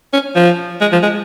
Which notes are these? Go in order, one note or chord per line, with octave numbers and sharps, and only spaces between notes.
C#4
F3
G#3
F3
G#3